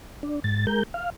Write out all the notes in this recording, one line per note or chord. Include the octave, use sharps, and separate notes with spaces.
D4
G#2 A6
G#3 A#4 G6
F5